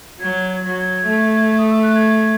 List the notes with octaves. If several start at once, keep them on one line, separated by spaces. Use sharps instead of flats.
F#3 G#6
G#6
F#3
G#6
A3
D#6
E6
F#6
G#6